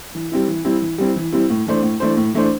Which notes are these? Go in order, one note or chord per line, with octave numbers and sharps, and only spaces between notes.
E3
G3 C4 E4
E3
G3 C4 E4
E3
G3 C4 E4
E3
G3 C4 E4
A2
E3 A3 D4 C5
A2
E3 A3 D4 C5
A2
E3 A3 D4 C5